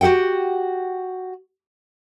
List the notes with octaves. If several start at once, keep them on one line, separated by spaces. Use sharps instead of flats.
F#4 G4 A4 F#5 G5